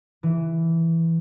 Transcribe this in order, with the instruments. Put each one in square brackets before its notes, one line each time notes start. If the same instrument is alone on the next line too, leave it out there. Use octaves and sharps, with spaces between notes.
[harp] E3